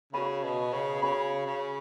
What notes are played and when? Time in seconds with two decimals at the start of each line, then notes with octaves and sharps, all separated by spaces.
0.13 C#3 F#4 C#5 G#5 B5
0.44 B2
0.73 C#3
1.02 C#3 F#4 C#5 G#5 B5
1.46 C#3